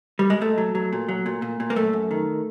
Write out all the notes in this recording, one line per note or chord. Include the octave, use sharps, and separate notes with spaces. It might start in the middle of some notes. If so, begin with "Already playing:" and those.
G3
G#3
A#2 A3
F#3
F#3
A#2
F#3
A#2
A#2
A#2
A#3
F#2 A3
F#2
D#3